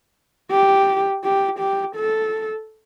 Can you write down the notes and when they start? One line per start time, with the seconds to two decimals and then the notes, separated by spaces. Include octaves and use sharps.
0.51 G4
1.24 G4
1.59 G4
1.96 A4